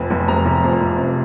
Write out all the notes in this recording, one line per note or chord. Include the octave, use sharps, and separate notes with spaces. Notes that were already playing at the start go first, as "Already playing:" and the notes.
Already playing: F1 F2
F1
C3 A#5
F1
F2
F1
C3